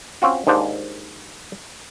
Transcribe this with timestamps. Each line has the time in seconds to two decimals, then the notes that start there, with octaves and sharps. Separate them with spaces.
0.22 C4 C#4 F4 F#4
0.47 D#2 G#2 D4 C5